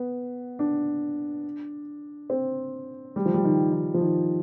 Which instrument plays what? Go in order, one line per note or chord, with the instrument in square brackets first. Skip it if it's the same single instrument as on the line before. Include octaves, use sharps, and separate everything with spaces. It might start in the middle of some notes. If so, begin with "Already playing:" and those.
Already playing: [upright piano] B3
D4
C4
G3
F3
G3
D#3
D#3
F3
D#3